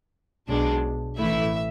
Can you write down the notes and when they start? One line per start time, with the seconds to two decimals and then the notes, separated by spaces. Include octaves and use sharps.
0.50 B1 B2 G#3 D4
1.18 A1 A2 E3 A3 E4 E5